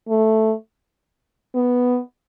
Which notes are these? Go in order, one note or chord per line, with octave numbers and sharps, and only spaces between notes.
A3
B3